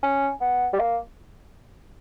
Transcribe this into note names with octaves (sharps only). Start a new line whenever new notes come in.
C#4
B3
G3
A#3